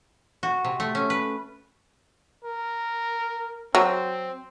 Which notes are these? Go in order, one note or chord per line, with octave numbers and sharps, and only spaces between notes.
F#4
C3
A3
C#4
B4
A#4
F#3 C4